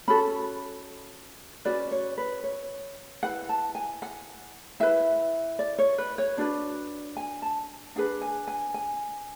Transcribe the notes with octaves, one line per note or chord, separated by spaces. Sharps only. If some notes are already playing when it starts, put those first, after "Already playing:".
C#4 F#4 A4 B5
C#4 F#4 B4 D5
C#5
B4
C#5
E4 B4 F#5
A5
G#5
F#5
E4 B4 E5
D5
C#5
B4
C#5
D4 F#4 B4 D5
G#5
A5
D4 G#4 B4 F#5
G#5
G#5
G#5